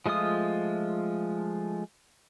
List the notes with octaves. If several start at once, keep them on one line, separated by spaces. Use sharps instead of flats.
F3 G#3 A3 F4 D#6